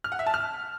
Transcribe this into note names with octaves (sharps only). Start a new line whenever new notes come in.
F6
F#5
E5
A5
F6